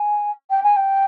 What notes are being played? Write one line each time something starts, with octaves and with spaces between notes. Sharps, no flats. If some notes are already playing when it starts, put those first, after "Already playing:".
Already playing: G#5
G5
G#5
G5